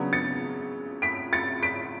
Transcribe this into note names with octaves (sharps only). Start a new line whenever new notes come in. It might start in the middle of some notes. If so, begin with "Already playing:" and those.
Already playing: C#3 F#3 B3 D4
A6 C#7
B6 D7
A6 C#7
B6 D7